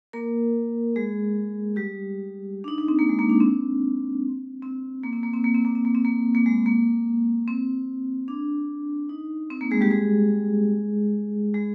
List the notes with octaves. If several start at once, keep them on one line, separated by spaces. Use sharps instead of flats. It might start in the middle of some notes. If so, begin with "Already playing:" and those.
A#3 A#4
G#3 G#4
G3 G4
D4
D#4
D#4
C4
A#3
G#3
A#3
D4
C4
C4
A#3
C4
A#3
C4
A#3
C4
A#3
C4
A#3
C4
A#3
A#3
G#3
A#3
C4
D4
D#4
C4
A#3
G#3 G#4
G3 G4
G#3 G#4
G#3 G#4